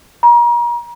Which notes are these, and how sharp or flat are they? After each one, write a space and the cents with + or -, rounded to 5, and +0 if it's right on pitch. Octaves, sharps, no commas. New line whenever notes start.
A#5 +35